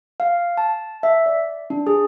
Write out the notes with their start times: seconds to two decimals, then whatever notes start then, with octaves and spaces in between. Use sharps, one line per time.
0.20 F5
0.57 A5
1.03 E5
1.26 D5
1.70 D4
1.87 G#4